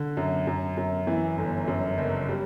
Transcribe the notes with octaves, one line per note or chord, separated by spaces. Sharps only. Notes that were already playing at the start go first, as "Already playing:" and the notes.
Already playing: D3
F#2
F#2
F#2
E3
G1
F#2
F#1
G3